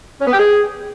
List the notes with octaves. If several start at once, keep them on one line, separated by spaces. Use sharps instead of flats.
C#4
B3
G4
G#4